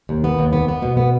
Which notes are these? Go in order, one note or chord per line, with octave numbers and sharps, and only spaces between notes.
D#2
B3
D#2
B3
B3
B2
B3